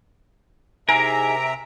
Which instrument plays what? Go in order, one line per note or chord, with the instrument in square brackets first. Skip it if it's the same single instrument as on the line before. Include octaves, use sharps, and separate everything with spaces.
[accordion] C3 E5 A#5 [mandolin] D#4 E4 G#4 [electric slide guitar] A#4